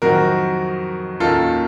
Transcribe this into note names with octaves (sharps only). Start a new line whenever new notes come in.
F2 D#3 F#3 C4 D#4 F#4 A#4
D#2 D#3 A#3 C#4 F4 A4